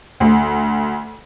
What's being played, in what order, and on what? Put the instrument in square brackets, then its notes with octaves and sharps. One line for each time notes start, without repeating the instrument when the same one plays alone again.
[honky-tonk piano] D2